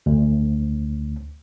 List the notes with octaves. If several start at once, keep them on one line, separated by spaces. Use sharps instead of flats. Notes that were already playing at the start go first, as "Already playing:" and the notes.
D2